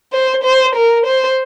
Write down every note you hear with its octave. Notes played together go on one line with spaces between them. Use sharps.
C5
C5
A#4
C5